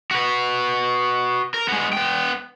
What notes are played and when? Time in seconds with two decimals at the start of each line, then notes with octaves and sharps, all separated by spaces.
0.11 F#4 B4
1.54 A#4
1.68 G#3 B3
1.93 B3 G5